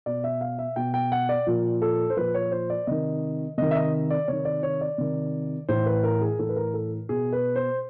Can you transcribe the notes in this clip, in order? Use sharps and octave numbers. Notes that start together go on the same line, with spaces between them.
B2 D5
E5
F5
E5
B2 G5
G5
F#5
D5
A#2 F3
A4
C5
A#2 F3 B4
C#5
C5
D5
C3 D#3 D#5
C3 D#3 D#5
E5
D#5
D5
C3 D#3 C#5
D5
C#5
D5
C3 D#3
A2 E3 C5
B4
A#4
G#4
A2 E3 A4
B4
A#4
A4
B2 G#4
B4
C5